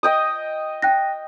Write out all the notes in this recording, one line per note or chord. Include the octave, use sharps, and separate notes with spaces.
D#5 G5 D#6
G5 F#6 A#6